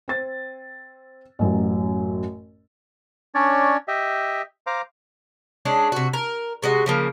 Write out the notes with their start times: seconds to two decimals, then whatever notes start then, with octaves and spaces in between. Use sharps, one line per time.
0.08 C4 A6
1.39 A1 F#2 F#3
3.35 C#4 D4 C#5 D5
3.88 G4 D#5 E5
4.67 C5 F5 A#5 D6
5.65 G#3 C#4 D4
5.92 C3 F#4
6.13 A#4
6.62 C3 G#3 F#4 D#5
6.86 C#3 F3 A#3